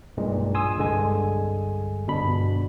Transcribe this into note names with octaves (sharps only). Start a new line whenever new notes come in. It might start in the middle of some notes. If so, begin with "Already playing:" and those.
B1 G2 A#2 G#3
G#5 C6 D#6 E6
G1 C2 G2 D3 G#3 G#5
G1 B2 D4 B5